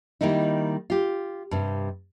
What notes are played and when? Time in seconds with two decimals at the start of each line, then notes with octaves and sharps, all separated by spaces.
0.21 D#3 G3 A#3 D#4 E4
0.90 F4 G4
1.51 G2 C3